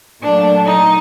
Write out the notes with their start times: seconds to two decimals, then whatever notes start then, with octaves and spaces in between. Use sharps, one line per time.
0.22 A#2 F#3 A3 D4
0.66 D#4